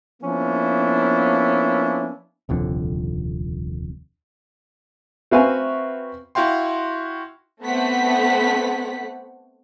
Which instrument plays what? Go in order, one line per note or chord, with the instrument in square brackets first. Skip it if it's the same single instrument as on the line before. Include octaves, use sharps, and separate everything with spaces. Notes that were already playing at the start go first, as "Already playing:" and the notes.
[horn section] F3 A#3 B3 C#4 D4 E4
[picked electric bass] D#1 C2 F2 D3
[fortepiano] C4 F#4 B4 E5 F5 G#5
[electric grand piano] E4 F#4 F5 G5 C6
[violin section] A3 B3 C4 D4 F#5 B6